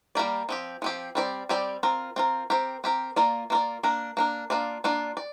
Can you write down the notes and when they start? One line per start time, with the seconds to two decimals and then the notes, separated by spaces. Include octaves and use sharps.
0.15 G3 A#3 G4 A#4 D5
0.49 F3 C4 G4
0.82 F3 C4 G4
1.15 G3 C4 G4 D5
1.49 G3 C4 G4 D5
1.83 C4 F4 A#4
2.16 C4 F4 A#4
2.50 C4 G4 A#4
2.84 C4 G4 A#4
3.16 A#3 F4 A#4 D5
3.50 A#3 F4 A#4 D5
3.83 A#3 D4 A#4
4.17 A#3 D4 A#4
4.50 A#3 D4 F4 D5
4.84 A#3 D4 F4 D5
5.17 D5